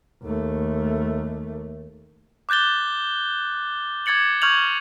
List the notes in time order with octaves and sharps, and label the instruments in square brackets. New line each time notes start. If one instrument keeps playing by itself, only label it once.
[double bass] D#2 A3
[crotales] D6 F#6 G6 A6 G7
D6 G#6 A6 C#7 F#7
C#6 F6 G6 G#6 F7 F#7